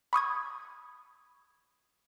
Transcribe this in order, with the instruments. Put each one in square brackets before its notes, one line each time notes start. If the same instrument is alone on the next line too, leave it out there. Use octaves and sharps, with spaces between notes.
[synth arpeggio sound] B5 C#6 D#6 G#6